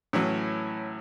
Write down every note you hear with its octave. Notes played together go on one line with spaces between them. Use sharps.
A2 E3 F#3 C#4